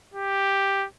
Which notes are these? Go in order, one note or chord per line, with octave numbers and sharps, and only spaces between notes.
G4